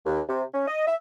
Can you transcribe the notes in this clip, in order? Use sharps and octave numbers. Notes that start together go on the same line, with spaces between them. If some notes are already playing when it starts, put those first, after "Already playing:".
D#2
C3
C#4
D#5
E5